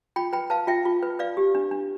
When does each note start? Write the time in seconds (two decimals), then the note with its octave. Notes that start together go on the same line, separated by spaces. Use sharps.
0.16 F4 G5 B5
0.33 B4 G5 B5
0.50 B4 F5 A5
0.67 F4 E5 G5
0.85 F4
1.03 B4
1.19 B4 D5 F5
1.37 G4
1.55 D4
1.71 D4